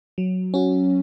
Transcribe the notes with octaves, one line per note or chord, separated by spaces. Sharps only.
F#3
C#4 F#4